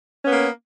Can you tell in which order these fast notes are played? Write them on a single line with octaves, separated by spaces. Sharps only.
C#4 B3 A#3